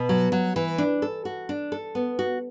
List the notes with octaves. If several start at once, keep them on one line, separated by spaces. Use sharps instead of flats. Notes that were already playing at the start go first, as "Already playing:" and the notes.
Already playing: B2
F#3
F#3
E3
D4
A4
F#4
D4
A4
B3
F#4